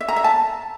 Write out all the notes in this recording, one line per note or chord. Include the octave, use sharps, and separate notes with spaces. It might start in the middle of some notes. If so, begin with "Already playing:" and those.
E5
A#5
E5
A5